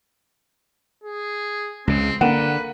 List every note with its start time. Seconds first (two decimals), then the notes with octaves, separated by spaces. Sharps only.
1.04 G#4
1.87 C#2 C#3 C4
2.21 D3 A#3 B4 F#5